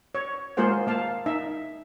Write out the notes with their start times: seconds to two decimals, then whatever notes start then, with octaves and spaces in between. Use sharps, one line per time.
0.15 C#5
0.57 G#3 A#3 F4 G#4 C5 F#5
0.87 A#3 F5 A5
1.26 D#4 E5